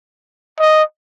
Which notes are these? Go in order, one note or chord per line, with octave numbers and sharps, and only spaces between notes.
D#5